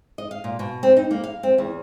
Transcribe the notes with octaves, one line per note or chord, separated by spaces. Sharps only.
D#5
F5
A#2
B2
C4
D#4
A#3
F5
C4
E2